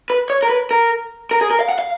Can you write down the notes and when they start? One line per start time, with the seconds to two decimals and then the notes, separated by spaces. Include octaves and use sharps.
0.10 B4
0.30 C#5
0.43 A#4
0.50 B4
0.71 A#4
1.31 A#4
1.41 G#4
1.51 A#4
1.61 F5
1.69 F#5
1.79 F5